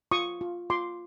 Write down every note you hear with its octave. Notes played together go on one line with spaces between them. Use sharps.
F4 C#6 D#6
F4
F4 C6 D6